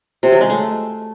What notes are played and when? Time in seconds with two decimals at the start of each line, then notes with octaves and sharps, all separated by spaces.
0.23 C3
0.32 F#3
0.41 G#3
0.50 A3